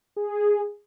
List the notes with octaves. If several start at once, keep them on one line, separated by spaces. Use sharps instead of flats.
G#4